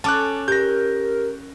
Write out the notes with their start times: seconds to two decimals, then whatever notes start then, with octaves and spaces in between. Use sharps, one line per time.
0.04 C#4 A4 A5 D6 F#6
0.48 G4 A#4 G6 A#6